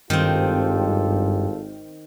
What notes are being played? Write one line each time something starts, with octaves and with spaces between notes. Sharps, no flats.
G#1 G2 D#3 C4 F4 G4 A4